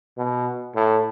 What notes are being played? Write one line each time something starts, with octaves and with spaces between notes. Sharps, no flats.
B2
A2